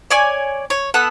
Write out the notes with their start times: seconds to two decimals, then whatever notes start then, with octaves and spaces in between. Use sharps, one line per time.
0.11 C#5 D5 G#5
0.70 C#5
0.94 B3 A4 F#5